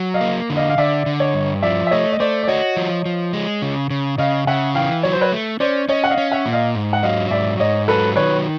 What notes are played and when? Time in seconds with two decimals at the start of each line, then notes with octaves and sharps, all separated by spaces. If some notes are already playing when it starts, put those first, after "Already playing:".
Already playing: F#3
0.14 D#5 F5
0.21 A#3
0.50 D3
0.57 D#5 F5
0.70 F5
0.78 D3 D5 E5
1.06 D3
1.20 C#5 D#5
1.34 G2
1.63 F3 D5 E5
1.87 E5
1.91 A3 C#5 D#5
2.13 D#5
2.20 A3 C5 D5
2.43 D5
2.48 F#4 C#5 D#5
2.77 F3
3.05 F3
3.33 G#3
3.62 C#3
3.90 C#3
4.18 C#3 D#5 F5
4.47 C#3 E5 F#5
4.75 E3 F5 G5
5.03 F#3 C#5
5.13 C5
5.21 B4 C#5
5.32 A3
5.60 C#4 C5 D5
5.89 C#4 C#5 D#5
6.04 F#5
6.10 D#5 F5
6.18 C#4
6.32 E5 F#5
6.46 A#2
6.53 D#5 F5
6.75 G#2
6.93 F#5
7.03 F#3 D#5 F5
7.31 G#2 D5 E5
7.60 G#2 C#5 D#5
7.88 F#3 A4 B4
8.16 D#3 B4 C#5